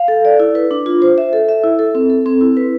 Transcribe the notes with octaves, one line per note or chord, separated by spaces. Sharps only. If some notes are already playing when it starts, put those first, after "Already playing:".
Already playing: F5
A4
D5
E4
B4
D4
F4
C5
E5
A4
E5
E4
A4
C4
A4
C4
E4
B4